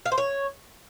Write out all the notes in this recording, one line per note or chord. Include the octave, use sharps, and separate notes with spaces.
F5
C5
C#5